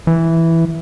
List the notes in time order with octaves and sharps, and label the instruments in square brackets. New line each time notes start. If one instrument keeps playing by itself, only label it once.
[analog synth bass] E3